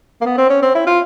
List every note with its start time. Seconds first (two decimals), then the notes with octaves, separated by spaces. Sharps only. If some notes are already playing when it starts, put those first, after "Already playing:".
0.21 A#3
0.26 B3
0.38 C4
0.50 C#4
0.62 C4
0.75 E4
0.87 F4